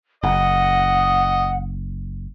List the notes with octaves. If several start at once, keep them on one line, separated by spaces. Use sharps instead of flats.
F#1 D#5 F#5